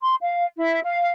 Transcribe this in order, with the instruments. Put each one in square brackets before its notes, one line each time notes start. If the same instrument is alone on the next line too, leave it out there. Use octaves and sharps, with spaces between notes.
[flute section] C6
F5
E4
F5